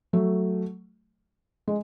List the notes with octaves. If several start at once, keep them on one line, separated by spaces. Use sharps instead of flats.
F#3 A3
G#3